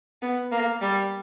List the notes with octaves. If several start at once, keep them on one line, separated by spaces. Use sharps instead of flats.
B3
A#3
G3